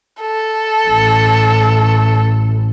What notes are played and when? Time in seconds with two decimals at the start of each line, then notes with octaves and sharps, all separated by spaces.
0.21 A4
0.87 A1